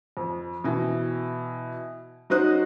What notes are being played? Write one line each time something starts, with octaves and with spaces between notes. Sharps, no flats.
F2
B2 E3
F#3 D#4 F#4 C5 D#6 F#6